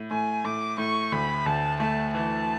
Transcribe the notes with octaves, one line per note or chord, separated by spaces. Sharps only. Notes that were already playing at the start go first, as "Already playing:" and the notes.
Already playing: A2
A2 G#5
A2 D6
A2 C#6
D2 B5
D2 A5
A3 A5
E3 A5